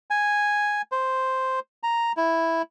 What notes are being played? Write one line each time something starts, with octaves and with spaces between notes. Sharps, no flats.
G#5
C5
A#5
E4